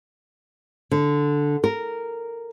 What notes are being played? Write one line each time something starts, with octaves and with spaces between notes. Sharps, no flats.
D3
A#4